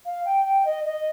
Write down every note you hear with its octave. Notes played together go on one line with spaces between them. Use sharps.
F5
G5
G5
D#5
D#5